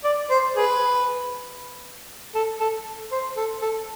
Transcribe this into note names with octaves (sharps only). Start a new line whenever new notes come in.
D5
C5
G#4 B4
A4
A4
C5
A4
A4